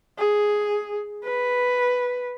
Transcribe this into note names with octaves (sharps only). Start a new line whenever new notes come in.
G#4
B4